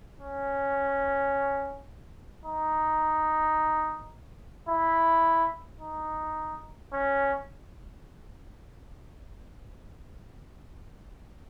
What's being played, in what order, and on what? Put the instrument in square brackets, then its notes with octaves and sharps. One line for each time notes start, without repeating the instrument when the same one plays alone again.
[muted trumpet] C#4
D#4
E4
D#4
C#4